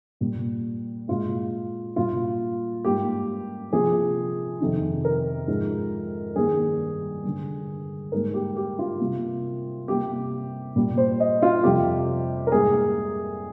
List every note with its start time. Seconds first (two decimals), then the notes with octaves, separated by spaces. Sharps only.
0.21 A#2 G3 A#3
1.08 A#2 G#3 F4
1.96 A#2 G3 A#3 F4
2.84 G#2 G3 A#3 G4
3.72 C3 F3 A#3 G#4
4.61 F2 C3 D#3
5.05 A#4
5.48 G#2 F3 G#3
6.36 G2 D#3 G3 A#3 G#4
7.24 G2 D3 G3
8.12 G#2 G3 A#3 A#4
8.34 G4
8.56 G4
8.79 F4
9.00 C3 G3 A#3
9.88 C3 G3 A#3 G4
10.76 A#2 G3 A#3
10.98 C5
11.20 D#5
11.42 F4
11.64 F2 C3 G3 G4
12.47 A#4
12.52 G#2 G3 A#3 G#4